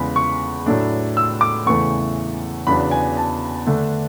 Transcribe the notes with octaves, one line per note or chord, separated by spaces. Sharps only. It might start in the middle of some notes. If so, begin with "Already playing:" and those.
Already playing: E2 C#3 G#3 B5
C#6
A2 F#3 A3 D4
E6
D6
E2 C#3 E3 A3 C#6
E2 C#3 F#3 B3 D4 B5
G#5
A5
D3 A3 D4